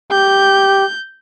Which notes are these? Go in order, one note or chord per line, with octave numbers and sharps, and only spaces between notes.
G4 G6